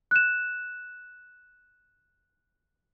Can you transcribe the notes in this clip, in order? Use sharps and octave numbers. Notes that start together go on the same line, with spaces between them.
F#6 E7